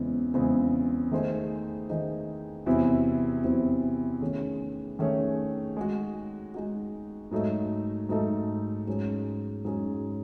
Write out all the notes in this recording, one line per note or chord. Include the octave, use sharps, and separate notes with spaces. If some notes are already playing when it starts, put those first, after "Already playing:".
Already playing: E2 C#3 G#3 C4
E2 C#3 G#3 C4
D#3 A3 D#4 G#4 C5
D#3 A3 D#4 G#4 C5
E2 C3 F#3 C4 E4
E2 C3 F#3 C4 E4
D#3 A3 C#4 G#4 C#5
D#3 A3 C#4 G#4 C#5
G#3 D#4 F#4
G#3 D#4 F#4
G#2 F#3 A3 D#4 A4
G#2 F#3 A3 D#4 A4
G#2 F#3 C#4 G#4
G#2 F#3 C#4 G#4